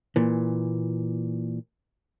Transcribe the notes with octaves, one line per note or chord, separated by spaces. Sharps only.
A#2 E3